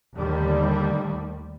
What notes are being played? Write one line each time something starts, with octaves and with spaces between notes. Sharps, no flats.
D#2 A2 D3 D#3 G3